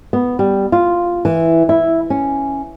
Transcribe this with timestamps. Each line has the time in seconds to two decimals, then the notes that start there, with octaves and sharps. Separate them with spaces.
0.13 B3
0.39 G3
0.72 F4
1.25 E3
1.69 E4
2.10 C#4